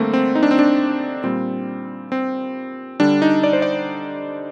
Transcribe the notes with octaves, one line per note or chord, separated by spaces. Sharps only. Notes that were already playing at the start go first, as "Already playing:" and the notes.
Already playing: D3 G3 A3 A#3 C4
C4
D#4
D4
C4
D4
A#2 G3 C4
C4
D3 G3 D4
D#4
D5
C5
D5